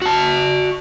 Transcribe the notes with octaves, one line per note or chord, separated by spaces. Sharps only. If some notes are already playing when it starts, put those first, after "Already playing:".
F#4 A5